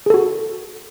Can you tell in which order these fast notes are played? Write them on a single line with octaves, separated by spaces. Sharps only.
G#4 A4 F#4